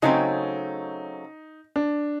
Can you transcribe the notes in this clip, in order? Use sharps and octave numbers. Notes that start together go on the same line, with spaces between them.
C#3 F#3 A3 C4 D#4
D4